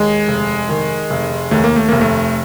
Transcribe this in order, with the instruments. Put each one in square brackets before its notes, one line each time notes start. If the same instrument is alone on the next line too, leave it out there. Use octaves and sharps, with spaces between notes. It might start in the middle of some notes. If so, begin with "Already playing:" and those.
Already playing: [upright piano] D#2 [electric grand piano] G#3
[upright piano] F1
D#3
F1
[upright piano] D#2 [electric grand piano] A3
[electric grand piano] A#3
A3
[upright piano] F1 [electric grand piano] A#3
[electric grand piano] A3